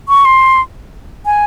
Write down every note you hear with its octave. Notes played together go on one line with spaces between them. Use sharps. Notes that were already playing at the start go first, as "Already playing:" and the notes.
C#6
C6
G#5